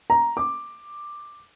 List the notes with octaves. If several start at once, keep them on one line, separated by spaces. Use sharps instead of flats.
A#5
D6